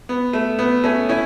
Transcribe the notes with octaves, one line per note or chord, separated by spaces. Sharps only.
B3
A3
B3
A3 C#4
C#4 E4